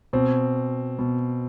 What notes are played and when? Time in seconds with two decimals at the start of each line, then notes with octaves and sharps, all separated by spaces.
0.13 B2 C4
0.99 B2